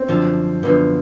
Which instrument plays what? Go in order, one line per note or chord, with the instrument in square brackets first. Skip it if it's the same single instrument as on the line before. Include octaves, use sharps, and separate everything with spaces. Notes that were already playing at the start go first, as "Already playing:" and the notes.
Already playing: [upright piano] C4
[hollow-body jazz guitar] F#2 D3 F3
[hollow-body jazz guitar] F#2 D3 F3 [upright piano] B3